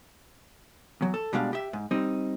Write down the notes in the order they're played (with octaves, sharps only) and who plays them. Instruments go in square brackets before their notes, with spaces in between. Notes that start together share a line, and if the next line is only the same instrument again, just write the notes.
[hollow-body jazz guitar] E2 F#3
A4
B2 G3 G#3 D4 F5
G4 E5
G#2
G3 C4 D#4